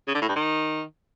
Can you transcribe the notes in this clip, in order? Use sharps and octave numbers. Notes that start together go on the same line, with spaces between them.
C#3
D3
A2
G2
D#3